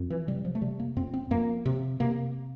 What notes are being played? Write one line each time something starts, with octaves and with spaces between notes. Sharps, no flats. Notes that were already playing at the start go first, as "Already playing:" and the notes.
Already playing: F2
E3
C3 G3
F3
A3
C3 G3
A#3
F2 C4
C4
F2 A#3
C3
C3 A#3